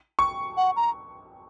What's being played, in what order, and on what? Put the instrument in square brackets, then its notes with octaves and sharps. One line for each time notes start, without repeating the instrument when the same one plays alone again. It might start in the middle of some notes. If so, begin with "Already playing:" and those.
[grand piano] C#6
[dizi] F#5
A#5